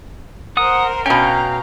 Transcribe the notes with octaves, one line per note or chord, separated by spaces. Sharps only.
A#4 C5 F#5 D#6
B2 C#4 F5 G5 A#5